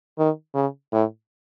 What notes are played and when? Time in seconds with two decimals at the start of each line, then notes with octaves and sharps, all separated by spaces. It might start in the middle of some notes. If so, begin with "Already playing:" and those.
0.18 D#3
0.55 C#3
0.93 A2